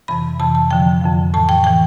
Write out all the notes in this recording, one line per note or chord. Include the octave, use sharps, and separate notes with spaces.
F2 C3 E3 B5
F2 C3 E3 A5
A5
F2 D3 F3 G5
F2 D3 F3
A2 E3 A5
G5
A2 E3 G5